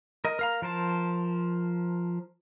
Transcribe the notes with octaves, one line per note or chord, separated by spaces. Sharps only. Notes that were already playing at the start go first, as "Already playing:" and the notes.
A#4 D#5
A#4 F5 A#5
F3 A#4 C5 A5